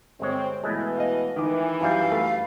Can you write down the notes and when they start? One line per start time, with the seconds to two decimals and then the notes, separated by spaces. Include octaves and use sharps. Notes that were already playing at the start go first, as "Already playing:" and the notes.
0.20 G1 G#3 C4 C#5
0.64 B2 E3 G#3 A3 E4
0.97 D#5 F5
1.36 D#3 E3 D6
1.81 F#2 G3 F5
2.12 A3 B5